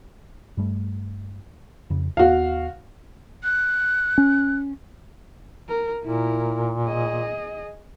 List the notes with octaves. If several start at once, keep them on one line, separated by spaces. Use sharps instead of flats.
G2 G3 A3
F2 C#3
D#2 B3 F#4 F5
F#6
C#4
A#4
A#2 E4 A#4
G#4 D#5